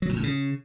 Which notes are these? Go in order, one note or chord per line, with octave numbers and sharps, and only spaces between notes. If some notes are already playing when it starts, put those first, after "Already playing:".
F#3
A#2
A2
C#3